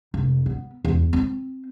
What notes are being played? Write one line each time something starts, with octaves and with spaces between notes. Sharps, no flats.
F1
B3
E2
C4